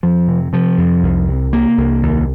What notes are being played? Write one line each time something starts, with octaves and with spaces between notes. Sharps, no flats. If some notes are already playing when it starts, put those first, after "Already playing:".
F2 F3
C3
C3 F3
F2
C2
C3
C3 A#3
C2
D#2